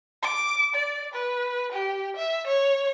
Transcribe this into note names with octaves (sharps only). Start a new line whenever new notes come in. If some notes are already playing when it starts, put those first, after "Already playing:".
D6
D5
B4
G4
E5
C#5